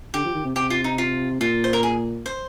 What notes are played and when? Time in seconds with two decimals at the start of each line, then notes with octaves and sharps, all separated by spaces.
0.14 D3 G4
0.24 F3
0.34 D#3
0.45 C3
0.56 C3 G4
0.70 F4
0.84 D#4
0.98 F4
1.40 A#2 F4
1.64 C5
1.73 A#4
1.83 G#4
2.26 C5